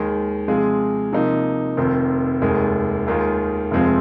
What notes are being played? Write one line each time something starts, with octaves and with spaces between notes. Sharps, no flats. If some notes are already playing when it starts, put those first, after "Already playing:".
Already playing: D#2 D#3 G#3
C3 F3 G#3 F4 G#4
C3 F3 A#3 D#4
F1 F2 D#3 C4
F1 D#2 D#3 G#3
D#2 D#3 G#3 F4
F1 F2 F3 G#3 C4